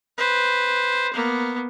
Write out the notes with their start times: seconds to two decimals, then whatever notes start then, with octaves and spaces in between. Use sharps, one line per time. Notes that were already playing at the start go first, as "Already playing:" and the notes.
0.17 B4 C5
1.13 A#3 B3